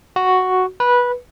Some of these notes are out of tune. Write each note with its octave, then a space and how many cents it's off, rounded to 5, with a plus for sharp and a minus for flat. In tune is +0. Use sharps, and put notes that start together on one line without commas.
F#4 +0
B4 -15